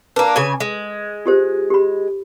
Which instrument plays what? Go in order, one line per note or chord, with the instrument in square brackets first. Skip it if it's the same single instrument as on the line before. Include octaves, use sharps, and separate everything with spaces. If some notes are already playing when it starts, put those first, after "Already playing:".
[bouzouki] A#3 D4 [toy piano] B4 A5
[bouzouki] C#3 G#5 [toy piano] G#4
[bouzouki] G#3
[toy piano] F4 G4 C5
G4 B5